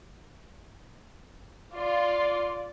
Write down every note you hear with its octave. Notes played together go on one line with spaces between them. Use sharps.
F4 D5 C6